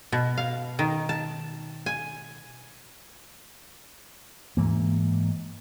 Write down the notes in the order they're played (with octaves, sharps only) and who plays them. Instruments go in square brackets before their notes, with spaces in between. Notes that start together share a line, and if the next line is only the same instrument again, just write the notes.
[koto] B2
F5
D#3
A5
G#5
[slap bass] G#2 E3 A#3